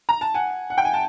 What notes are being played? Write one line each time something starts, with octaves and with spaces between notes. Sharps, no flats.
A#5
A5
F#5 G#5
F#5
G5
G#5
A5